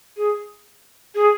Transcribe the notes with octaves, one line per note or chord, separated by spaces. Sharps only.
G#4
G#4